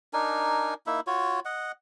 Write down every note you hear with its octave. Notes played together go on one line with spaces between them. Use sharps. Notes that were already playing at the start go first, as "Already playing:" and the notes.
D4 D#4 A#4 G#5
A#3 D#4 E4 E5
F4 F#4 C#5
D#5 F#5